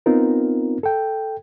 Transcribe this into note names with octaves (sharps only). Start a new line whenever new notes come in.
B3 C4 D#4 F4 A#4
A4 G5